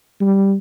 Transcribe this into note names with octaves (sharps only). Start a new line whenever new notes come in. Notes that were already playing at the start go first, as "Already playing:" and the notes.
G3